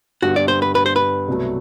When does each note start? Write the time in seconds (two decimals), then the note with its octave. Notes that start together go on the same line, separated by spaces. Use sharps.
0.22 G2 D3 G3 B3 F#4
0.36 D5
0.48 C5
0.62 B4
0.75 B4
0.86 C5
0.96 B4
1.28 C2 B2 F#3 A3